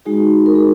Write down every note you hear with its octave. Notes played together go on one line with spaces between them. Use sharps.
G#3 D#4 F#4 G#4
A#4
G#4